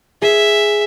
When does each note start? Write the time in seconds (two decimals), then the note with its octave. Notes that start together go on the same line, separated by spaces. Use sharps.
0.22 G#4 E5